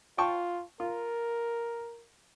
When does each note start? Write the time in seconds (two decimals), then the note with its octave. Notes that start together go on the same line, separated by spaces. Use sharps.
0.18 F4 G5 A5 C#6
0.80 F4 A#4